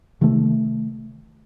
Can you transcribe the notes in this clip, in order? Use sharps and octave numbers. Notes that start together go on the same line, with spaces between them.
C3 D#3 A3